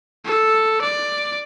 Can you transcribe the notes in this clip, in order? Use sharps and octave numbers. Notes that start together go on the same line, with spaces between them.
A4
D5